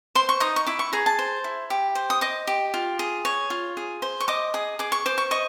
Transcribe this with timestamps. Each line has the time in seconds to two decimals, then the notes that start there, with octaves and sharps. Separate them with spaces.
0.15 C5 C6
0.29 C#6
0.40 D#4 D#6
0.56 C#6
0.66 E4 D6
0.79 C#6
0.93 G#4 A#5
1.06 A5
1.19 C5
1.44 E4
1.70 G4
1.95 C5
2.10 D#6
2.21 D#5 D6
2.47 G4
2.74 F4
2.99 G#4
3.25 C#5
3.50 F4
3.77 G#4
4.02 C5
4.20 C#6
4.28 D#5 D6
4.54 G#4 D#6
4.79 G#4 D6
4.92 C#6
5.06 C5 D6
5.18 C#6
5.31 D#5 C#6